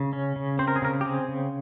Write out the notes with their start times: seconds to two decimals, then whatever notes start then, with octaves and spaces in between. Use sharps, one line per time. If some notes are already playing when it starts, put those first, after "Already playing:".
Already playing: C#3
0.13 C#4
0.36 C#3
0.59 C4 C5
0.68 A#4
0.76 G#4
0.82 C#3 A#4
1.01 G4
1.05 C4 G#4
1.28 C#3